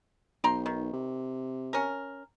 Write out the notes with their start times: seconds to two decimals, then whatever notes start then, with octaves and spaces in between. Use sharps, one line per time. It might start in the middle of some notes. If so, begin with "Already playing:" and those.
0.44 B1 G5 A#5 C6
0.66 D#3
0.93 C3
1.73 C#4 A#4